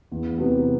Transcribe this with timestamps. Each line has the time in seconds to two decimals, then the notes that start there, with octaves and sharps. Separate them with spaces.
0.12 E2
0.38 C3 F#3 B3